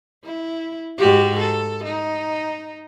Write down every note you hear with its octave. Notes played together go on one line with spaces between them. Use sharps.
E4
G#2 F#4 G4
A4
D#4